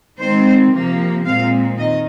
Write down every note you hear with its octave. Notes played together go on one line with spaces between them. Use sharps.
D#3 G#3 C4 C5
C3 F3 A#3
A#2 G#3 C4 F5
D#3 D#5